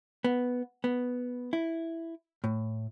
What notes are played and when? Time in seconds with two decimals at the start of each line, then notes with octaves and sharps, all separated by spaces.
0.24 B3
0.84 B3
1.53 E4
2.44 A2